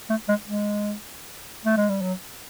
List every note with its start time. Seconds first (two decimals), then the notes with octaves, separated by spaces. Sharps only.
0.10 A3
0.28 G#3
0.47 G#3
1.65 A3
1.77 G#3
1.89 G3
2.02 F#3